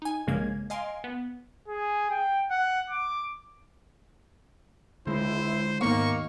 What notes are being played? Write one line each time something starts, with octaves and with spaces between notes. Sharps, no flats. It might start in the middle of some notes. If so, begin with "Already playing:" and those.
D#4 G#5
A#1 G2 C#3 G#3 A#3 G#6
D#5 F5 G#5 C6 D7
B3
G#4
G5
F#5
D6
C#2 D3 G#3 E4 C5
D#2 G#2 A#3 B3 C#6